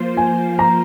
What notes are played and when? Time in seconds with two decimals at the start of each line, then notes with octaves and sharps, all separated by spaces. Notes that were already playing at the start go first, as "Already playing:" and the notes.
Already playing: F3 A#3 F4 C5
0.17 G#5
0.59 A#5